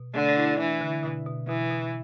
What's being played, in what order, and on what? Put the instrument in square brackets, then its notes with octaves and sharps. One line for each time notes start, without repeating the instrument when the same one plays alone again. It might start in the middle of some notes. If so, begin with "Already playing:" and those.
Already playing: [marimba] B2
[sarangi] D3 [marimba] A3
[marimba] E4
[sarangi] E3 [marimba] D4
[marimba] D3
B2
B2
[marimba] B2 [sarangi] E3
[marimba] B2